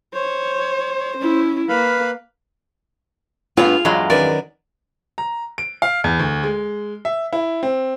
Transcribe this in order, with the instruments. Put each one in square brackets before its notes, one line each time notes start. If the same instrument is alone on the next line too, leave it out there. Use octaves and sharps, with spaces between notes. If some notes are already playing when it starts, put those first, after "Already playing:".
[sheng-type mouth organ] C5 [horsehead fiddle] C#5
[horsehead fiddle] C#4 E4
[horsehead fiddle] A#3 [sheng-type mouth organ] B4 F5 B5
[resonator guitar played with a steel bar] G2 B3 [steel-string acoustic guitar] F4 F5 [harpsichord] G#4
[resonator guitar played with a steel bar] E2 G2 G#3 [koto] F#3
[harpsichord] F#2 D#3 B4 [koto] D5
[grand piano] A#5
D7
F5
E2
D2
G#3
E5
E4
C4